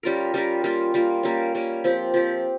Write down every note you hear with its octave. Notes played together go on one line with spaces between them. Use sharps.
G3 C#4 F4 A#4
G3 C#4 F4 A#4
G3 A#3 F4
G3 A#3 F4
G3 A#3 C#4
G3 A#3 C#4
F3 C4 G4
F3 C4 G4